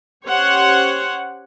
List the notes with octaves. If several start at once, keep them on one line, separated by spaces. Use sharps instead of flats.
C#4 G4 C5 C#5 F#5